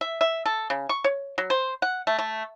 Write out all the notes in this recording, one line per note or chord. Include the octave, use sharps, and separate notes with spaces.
E5
E5
A4
C#3
C#6
C#5
F#3
C5
F#5
A3
A3